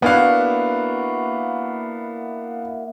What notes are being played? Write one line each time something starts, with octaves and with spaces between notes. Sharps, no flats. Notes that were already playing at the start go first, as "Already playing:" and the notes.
A#3 B3 D4 E4 F#4 F5